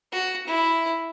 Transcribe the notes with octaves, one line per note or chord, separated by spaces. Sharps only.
F#4
E4